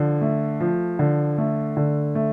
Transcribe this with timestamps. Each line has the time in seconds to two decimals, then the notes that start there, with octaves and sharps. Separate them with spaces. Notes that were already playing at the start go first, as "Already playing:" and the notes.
Already playing: D3 F3
0.21 A3
0.60 F3
0.99 D3
1.38 A3
1.77 D3
2.15 A3